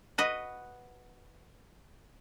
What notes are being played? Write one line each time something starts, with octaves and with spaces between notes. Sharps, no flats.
F#4 B4 D#5